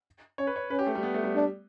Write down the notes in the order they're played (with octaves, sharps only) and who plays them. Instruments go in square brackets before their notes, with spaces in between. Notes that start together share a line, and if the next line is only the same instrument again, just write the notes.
[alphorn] C#4 [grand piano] C#5
[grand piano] B4
C#5
[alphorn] C#4 [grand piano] B4
[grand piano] G4
A3
G3
B3
A3
G3
[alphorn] D4